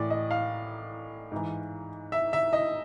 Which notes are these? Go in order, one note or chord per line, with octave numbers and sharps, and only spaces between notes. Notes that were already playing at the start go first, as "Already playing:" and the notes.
Already playing: A2 E3 D5
D#5
F5
G#2 E3
E5
E5
D#5